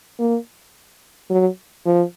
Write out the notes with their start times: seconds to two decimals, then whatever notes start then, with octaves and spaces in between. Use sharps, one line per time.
0.20 A#3
1.30 F#3
1.86 F3